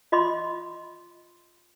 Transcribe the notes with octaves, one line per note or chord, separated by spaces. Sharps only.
F4 D#5 B5 C6 D6